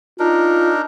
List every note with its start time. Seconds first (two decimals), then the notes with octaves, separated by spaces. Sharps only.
0.20 D4 D#4 F4 A#4